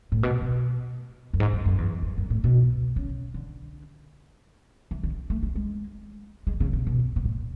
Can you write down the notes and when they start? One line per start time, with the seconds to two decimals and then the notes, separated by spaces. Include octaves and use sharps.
0.12 A2
0.23 B2
0.41 B2
1.34 F#2
1.40 G#2
1.53 F#2
1.66 F#2
1.78 E2
2.02 E2
2.18 F#2
2.30 A2
2.44 B2
2.96 C#3
3.34 D3
4.91 E3
5.03 D3
5.30 A3
5.43 G#3
5.55 G#3
6.47 G#3
6.60 C#3
6.73 B2
6.87 B2
7.16 B2
7.25 A2